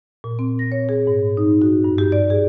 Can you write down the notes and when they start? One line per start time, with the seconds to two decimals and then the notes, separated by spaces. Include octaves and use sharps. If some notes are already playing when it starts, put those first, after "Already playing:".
0.24 A#2
0.39 C4
0.59 A#6
0.72 C#5
0.89 G#4
1.07 G#2
1.37 D#4
1.62 F#4
1.84 G2
1.98 G4
2.12 D5
2.30 G#4